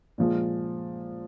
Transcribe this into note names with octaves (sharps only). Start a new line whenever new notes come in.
A#2 F3 G#3